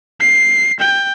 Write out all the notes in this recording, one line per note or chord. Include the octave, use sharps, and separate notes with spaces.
C7
G5